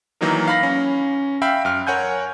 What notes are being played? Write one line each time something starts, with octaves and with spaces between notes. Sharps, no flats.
D#3 E3 F#3 A#3 D#4 A#4
F5 B5 A#6
C#4
E5 F5 G5 B5
F#2 F6
A#4 C#5 F#5 G#5 G6